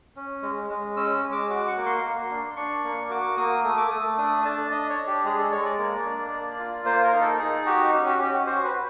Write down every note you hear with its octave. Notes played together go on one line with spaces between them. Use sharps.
C#4
G#3
G#3
C#4 E6
G#3
D6
F#4 D6
C#6
A#3
C6
A#3
D4
D4 C#6
A#3
F#4 D6
A#3 D#6
A3 D#6
D6
A3 D#6
D4 D#6
D4 A5
D4 D#5
C#5
D4
G4
G#3 G#4
A4
G#3 C#5
D5
A#3
D4
A#3
F4
A#3 C5
A#4
D#4
A4
D#4 G#4
F#4 G4
C#4
G4
C#4 G4
F#4
F#4 C5
B4
F#4